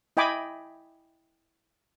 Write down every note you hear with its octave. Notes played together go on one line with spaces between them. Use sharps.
E4 D#5 G5 G#5 B5 D6